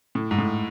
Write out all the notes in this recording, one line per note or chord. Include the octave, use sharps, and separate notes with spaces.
A2
G#2
A2